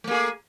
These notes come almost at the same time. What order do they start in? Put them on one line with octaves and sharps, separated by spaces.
A3 A#3 G#4